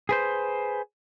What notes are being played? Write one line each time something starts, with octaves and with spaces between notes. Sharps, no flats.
G#4 B4 C5